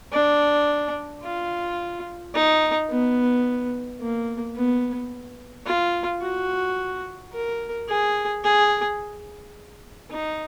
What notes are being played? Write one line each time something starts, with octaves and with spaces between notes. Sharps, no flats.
D4
F4
D#4
B3
A#3
B3
F4
F#4
A#4
G#4
G#4
D#4